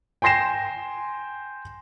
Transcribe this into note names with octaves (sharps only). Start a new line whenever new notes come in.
G5 G#5 C6 A#6 C7 E7